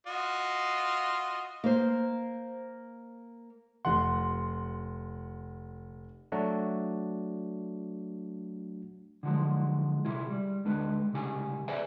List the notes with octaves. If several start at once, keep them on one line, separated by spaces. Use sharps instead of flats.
F4 F#4 D#5
A#3 C5
F1 F#5 C6
F#3 A3 D4 F#4
D3 F3 F#3 G#3
C3 E4 F4 G#4
G3
D2 G#3 D4 B4
C2 C#3 G4 G#5
G#4 B4 C5 D5 E5 G#5